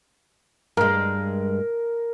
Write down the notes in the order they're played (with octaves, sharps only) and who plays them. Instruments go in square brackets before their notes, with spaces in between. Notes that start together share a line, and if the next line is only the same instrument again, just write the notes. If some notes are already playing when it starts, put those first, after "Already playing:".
[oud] G2 G#3 [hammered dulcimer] A#4